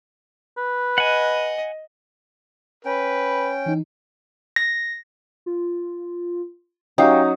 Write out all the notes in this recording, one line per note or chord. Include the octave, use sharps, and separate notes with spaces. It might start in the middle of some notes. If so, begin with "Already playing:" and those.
B4
D#5 F#5 G#5
C#4 B4 G5
E3 D#4
A#6
F4
F#3 C#4 D#4 G4 F5 G5